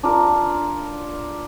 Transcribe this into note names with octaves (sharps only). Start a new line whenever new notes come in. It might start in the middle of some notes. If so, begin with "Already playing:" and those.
D4 F4 A#4